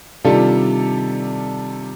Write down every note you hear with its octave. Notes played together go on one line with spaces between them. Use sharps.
C3 D#3 G3 D4 F4 A4